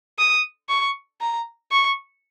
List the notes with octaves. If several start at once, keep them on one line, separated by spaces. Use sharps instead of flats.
D#6
C#6
A#5
C#6